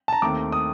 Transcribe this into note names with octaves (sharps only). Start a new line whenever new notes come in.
A5
A#5
D#2 D#3 A3 C4 D6
D#6